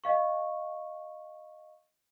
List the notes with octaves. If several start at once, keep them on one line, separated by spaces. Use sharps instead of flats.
D#5 F5 C#6